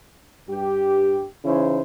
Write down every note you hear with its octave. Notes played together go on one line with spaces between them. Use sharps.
G2 G4
C#3 E3 C#4 D#4 E4 C5